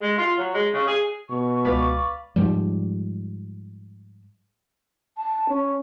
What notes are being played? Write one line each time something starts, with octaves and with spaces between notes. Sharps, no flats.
G#3
F4
F#3
G#3
C#3
G#4
B2 C#6
C#2 B4 D5 F5
G#2 F3 G3
A5
C#4